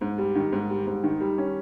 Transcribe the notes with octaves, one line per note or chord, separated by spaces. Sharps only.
G#2
G3
D#3
G#2
G3
G#2
D#3
G3
C#4